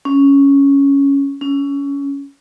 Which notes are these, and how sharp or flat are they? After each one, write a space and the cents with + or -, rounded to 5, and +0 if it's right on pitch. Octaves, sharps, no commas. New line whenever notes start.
C#4 +5
C#4 +20